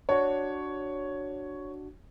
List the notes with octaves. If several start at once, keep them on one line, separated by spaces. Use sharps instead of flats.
D4 F#4 C#5